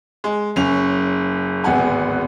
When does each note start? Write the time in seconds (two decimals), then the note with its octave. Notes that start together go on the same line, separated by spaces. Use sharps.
0.24 G#3
0.56 F#1 C#4 F7
1.64 D1 G#1 B3 F#5 G#5